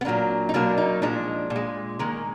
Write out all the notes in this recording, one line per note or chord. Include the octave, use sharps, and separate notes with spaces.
B3
A#2 F#3 A#3 D4
D#4
B2 F#3 A#3 D4
D#4
A#2 F3 G#3 D4
A#2
G#3
D#3 G#3 A#3